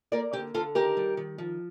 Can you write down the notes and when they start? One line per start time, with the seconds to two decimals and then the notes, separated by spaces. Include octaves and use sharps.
0.12 A#3 A#4 D5
0.33 D3 G4
0.54 D3 F4 A4
0.75 D#3 G4 A#4
0.97 G3
1.17 D#3
1.38 F3